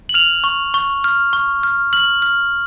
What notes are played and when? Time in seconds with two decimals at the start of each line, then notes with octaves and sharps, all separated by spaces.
0.09 F#7
0.14 F6 F7
0.44 C#6
0.74 C#6
1.04 F6
1.33 C#6
1.63 F6
1.93 F6 F#7
2.22 F6